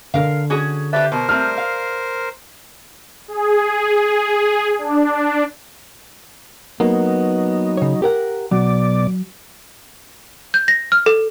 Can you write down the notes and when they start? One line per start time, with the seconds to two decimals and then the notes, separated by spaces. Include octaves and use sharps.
0.14 D3 A#4 F5
0.50 C#4 F#4 G#4
0.93 G4 B4 C5 D5 E5 A5
1.12 B2 A#4 C5
1.29 G3 A3 C4 F6
1.58 F5
3.28 G#4
3.95 G#4
4.78 D4
6.80 F#3 A#3 B3 D#4
7.77 C#3 C#5
8.02 G4 A#4 F#5
8.51 B2 F#3 D5
10.54 G6
10.68 A#6
10.92 F6
11.06 A4